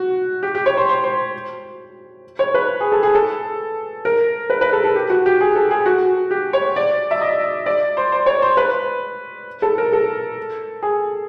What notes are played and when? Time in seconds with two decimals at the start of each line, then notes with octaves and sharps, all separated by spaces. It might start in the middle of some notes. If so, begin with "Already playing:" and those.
Already playing: F#4
0.43 G4
0.55 G4
0.66 C#5
0.77 C5
0.89 C5
1.04 C5
2.39 C#5
2.54 B4
2.81 G#4
2.92 A4
3.03 G#4
3.15 A4
4.05 A#4
4.50 B4
4.61 B4
4.73 A4
4.84 A4
4.95 G4
5.10 F#4
5.26 G4
5.41 G#4
5.55 A4
5.71 G#4
5.86 F#4
6.31 G4
6.53 C#5
6.76 D5
7.11 E5
7.21 D#5
7.66 D5
7.97 C5
8.12 C5
8.26 C#5
8.42 C5
8.57 B4
9.62 A4
9.78 A#4
9.92 A4
10.82 G#4